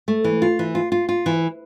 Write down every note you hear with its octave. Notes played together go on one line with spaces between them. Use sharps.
A3
E3
F4
E3
F4
F4
F4
E3